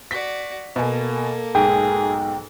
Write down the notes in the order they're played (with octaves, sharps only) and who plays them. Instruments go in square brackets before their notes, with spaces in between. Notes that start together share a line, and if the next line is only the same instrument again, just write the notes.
[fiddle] F#4 D5 [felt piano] B6
[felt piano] B2 G#5 [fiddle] A#3 A4
[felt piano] B1 G#2 [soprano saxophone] G#4 [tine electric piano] G5